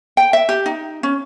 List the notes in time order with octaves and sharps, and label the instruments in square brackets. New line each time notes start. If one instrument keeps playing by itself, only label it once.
[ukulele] G5
E5
G4
D#4
C#4